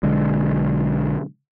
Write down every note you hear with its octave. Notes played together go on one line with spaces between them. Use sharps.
B1 D3 G#3